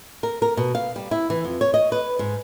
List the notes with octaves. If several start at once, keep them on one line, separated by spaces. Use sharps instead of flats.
A#4
A#4
B2
F5
G3
E4
E3
F2
C#5
D#5
B4
G#2